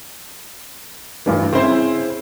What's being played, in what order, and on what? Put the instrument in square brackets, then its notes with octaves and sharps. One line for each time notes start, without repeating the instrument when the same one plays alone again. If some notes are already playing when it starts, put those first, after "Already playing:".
[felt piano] D2 G2 E3
[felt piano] C#3 E4 [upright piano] C4 C5